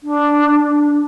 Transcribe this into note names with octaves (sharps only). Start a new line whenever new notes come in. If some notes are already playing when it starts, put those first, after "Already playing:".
D4